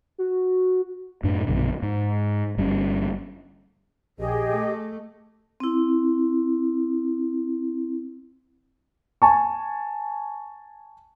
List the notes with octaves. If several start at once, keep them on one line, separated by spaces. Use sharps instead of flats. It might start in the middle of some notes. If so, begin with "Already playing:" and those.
F#4
F#2 A2 D4
A#1 F#2 B2 D3
G#2
G1 G3 C4 C#4
A#1 G4 G#4 D#5
A3
C4 E4
G#5 A5 C#6